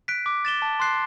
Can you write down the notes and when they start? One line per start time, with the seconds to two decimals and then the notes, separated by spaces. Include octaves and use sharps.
0.08 F#6 B6 D7
0.26 D6
0.45 A6 E7 G7
0.62 A5
0.80 C6 F#6 C7